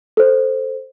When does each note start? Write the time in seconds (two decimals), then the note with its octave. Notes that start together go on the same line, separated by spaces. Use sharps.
0.17 A4 C5